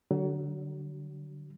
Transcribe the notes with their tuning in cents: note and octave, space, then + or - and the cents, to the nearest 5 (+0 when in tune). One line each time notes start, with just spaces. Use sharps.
D3 +0 F#3 +30